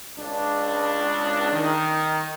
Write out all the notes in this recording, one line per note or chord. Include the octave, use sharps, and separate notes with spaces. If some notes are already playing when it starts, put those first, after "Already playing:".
C#2 D4
D#3